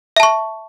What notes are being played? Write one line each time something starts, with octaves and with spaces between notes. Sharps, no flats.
E5 A5 C#6